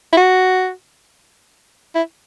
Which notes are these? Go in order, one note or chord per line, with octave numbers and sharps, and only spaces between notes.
E4
F#4
E4